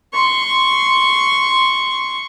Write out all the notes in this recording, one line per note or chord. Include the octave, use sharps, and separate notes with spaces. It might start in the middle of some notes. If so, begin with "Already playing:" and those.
C6 C#6